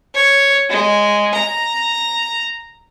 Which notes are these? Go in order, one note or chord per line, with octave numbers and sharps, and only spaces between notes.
C#5
G#3
A#5